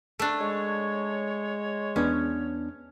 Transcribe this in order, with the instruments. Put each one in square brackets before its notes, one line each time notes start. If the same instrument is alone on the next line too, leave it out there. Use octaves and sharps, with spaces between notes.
[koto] A3 D4
[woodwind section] G#3 C#5
[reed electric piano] E2 B3 D4 [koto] C#4